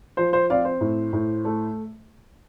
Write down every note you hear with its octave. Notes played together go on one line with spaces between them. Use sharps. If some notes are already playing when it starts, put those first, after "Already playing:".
F3 C5
C5
C4 D5 F5
C5
A2
A2
A3